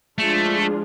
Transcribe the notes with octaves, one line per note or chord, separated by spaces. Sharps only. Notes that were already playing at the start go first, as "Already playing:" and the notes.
F3 G#3 A3 D4 F4 G#4